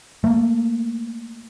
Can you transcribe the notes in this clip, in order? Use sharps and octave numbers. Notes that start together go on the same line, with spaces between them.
A3 A#3